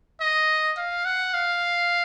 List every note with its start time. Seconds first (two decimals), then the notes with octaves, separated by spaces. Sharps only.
0.20 D#5
0.77 F5
1.05 F#5
1.34 F5